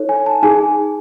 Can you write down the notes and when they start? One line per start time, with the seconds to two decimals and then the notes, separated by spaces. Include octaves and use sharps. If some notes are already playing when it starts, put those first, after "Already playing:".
Already playing: D#4 A4 C#5
0.09 G#5
0.26 A5
0.43 D#4 G#4 G#5